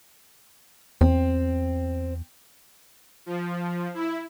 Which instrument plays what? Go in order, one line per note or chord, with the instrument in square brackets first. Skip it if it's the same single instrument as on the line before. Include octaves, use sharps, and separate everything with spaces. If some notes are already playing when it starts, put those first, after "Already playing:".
[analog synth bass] E2 [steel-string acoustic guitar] C4
[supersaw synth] F3
E4